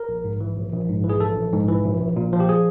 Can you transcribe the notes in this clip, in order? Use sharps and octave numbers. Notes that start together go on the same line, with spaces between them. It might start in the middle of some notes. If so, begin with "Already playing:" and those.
Already playing: A#4
A#1
G#2
E3
A#1
A#1
G#2
E3
G#4
A#1 A4
A#1
G#2
E3
A#1
A#1
A#2
F3
G4
G#4